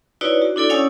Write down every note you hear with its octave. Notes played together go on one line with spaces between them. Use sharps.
D#4 E4 F#4 B4 C#5 D5
F#4
D4 E4 A4 D5
C#4 C#5 F#5 G#5 D#6 E6